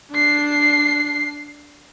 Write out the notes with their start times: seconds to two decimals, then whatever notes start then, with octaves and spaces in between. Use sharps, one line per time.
0.11 D4 C7